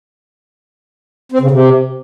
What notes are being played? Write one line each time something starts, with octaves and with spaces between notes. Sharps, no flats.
C4
C#3
C3